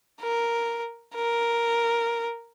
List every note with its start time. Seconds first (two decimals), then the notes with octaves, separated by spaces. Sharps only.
0.21 A#4
1.15 A#4